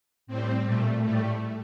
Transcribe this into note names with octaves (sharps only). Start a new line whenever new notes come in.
A2 G3 C4
A#2 G3 A3
A2 G3 A3